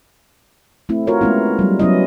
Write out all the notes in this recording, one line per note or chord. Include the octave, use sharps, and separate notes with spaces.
A3 C4 E4
F4 F#4 A#4 C#5
G#3 A3 B3 C#4 E4
F#3 G3
F#3 B3 C#4 E4 D#5